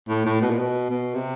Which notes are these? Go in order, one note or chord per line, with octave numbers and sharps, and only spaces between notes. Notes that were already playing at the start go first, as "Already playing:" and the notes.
A2
A2
B2
A#2
B2
B2
C3